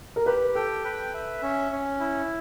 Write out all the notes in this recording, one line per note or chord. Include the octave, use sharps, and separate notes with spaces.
A#4
G4 B4
A4 G5
B4
E5
C#4
C#4
E4